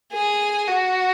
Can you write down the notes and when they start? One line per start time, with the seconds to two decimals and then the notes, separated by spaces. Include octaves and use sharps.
0.12 G#4
0.67 F#4